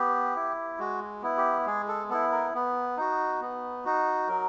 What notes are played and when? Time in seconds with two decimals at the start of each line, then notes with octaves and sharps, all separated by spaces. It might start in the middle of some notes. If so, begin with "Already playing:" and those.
Already playing: B3 G4
0.36 E4
0.79 G#3 F#4
1.22 B3 E4
1.37 G4
1.66 G#3 G#4
1.88 A4
2.10 B3 E4 A4
2.32 A#4
2.54 B3
2.97 D#4 F#4
3.41 B3
3.85 D#4 F#4
4.28 F#3 A#4